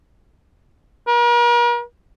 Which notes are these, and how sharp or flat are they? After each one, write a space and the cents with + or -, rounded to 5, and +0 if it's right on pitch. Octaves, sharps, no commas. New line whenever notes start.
A#4 +45